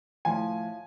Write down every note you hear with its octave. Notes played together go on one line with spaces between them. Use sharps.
A2 F3 G#5